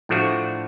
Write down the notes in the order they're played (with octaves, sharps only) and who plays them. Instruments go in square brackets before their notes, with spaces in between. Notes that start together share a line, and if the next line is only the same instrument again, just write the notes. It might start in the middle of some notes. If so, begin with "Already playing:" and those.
[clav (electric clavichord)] A2 F3 A3 D4 F#4